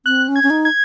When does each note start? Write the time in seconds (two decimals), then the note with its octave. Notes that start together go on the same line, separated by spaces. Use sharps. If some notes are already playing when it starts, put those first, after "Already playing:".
0.06 C4 F#6
0.28 C#4
0.36 G#6
0.43 C#4
0.50 D#4
0.65 G#6